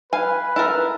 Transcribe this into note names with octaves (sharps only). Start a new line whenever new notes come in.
B4 F5 G#5
E4 A4 A#4